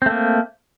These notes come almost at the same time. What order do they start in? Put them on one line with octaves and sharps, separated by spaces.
C4 A3 A#3